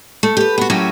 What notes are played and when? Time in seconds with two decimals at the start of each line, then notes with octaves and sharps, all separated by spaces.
0.23 A3
0.37 G4 B4
0.58 B3 F#4
0.70 F#2 A2 F#3 C#4 F#4 G4